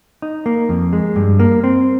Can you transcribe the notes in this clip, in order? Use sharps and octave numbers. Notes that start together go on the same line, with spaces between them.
D#4
A#3
F2
G#3
G2
A#3
C4